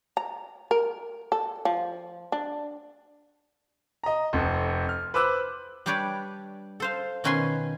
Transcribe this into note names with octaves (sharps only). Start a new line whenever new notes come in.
A#5
A#4
A4
F3
D4
D#5 A#5
F1 F2
F6
B4 C5 D6 E6 F#6
G3 D4 G4 B4 C#5 D5
A4 C5 F5
B2 D#3 C#4 B4 G#5 C6